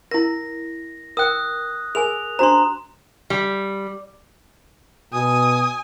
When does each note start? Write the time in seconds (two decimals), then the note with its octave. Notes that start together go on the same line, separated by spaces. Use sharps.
0.11 E4 A#4 A#6
1.17 A#4 G5 D#6 F#6
1.95 G#4 A#4 G#5 F7
2.39 D4 F#4 C5 A#5 C6
3.30 G3
5.13 B2 G#5 D#6